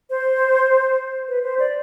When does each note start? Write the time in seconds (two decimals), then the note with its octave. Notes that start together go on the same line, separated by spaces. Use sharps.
0.10 C5
1.28 B4
1.44 C5
1.59 D5